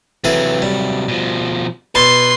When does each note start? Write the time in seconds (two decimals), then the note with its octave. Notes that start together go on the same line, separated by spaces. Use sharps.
0.24 C3 E3 F#3 G#4 A4
0.62 G3
1.08 B2 F3
1.95 B2 B4 A5 C6